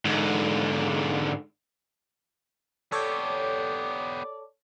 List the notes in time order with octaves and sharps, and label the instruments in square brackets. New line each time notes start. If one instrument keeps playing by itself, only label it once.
[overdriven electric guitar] G#2 D3
[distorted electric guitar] B3 G4 [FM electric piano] A4 C#5 [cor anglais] D5